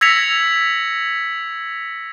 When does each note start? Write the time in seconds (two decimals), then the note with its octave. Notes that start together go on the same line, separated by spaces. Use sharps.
0.01 E6 G#6 A#6 B6 C#7 F7